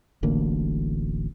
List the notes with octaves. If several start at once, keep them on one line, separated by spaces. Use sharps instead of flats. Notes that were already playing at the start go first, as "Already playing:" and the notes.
D1 A1 D2 A#3